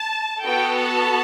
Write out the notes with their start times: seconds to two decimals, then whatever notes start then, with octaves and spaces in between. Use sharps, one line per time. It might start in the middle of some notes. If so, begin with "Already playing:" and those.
Already playing: A5
0.45 B3 F#4 A4 G5
0.75 A5